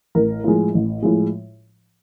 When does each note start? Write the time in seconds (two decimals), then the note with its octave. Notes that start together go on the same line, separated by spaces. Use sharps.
0.15 A1 A#4
0.44 A2 F3 G#3
0.74 A1
1.02 A2 F3 G#3